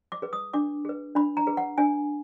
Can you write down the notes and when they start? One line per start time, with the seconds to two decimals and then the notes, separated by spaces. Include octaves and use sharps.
0.12 D6
0.22 G#4 B4
0.33 D#6
0.54 D4 D6
0.85 G#4 B4
1.15 D4 B5
1.37 A#5
1.47 G#4 B4
1.57 F#5
1.78 D4 G#5